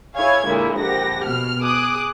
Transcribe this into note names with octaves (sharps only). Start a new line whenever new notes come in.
E4 G#4 C#5 F5 G#5 G#6
A#2 D3 G#3 E4 G#4
A#1 G4 F#5 A#6
B2 F6
G#4 D6 D#6 F#6